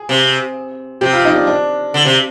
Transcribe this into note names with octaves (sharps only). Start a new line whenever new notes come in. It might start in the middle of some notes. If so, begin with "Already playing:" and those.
Already playing: G#4
C3
C3 G4
F4
D#4
D4
D4
D3
C3